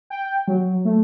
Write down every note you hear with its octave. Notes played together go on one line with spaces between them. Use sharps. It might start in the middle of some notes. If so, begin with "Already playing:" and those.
G5
F#3
A3